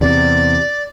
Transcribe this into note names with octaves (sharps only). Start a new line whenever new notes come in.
E2 C3 D5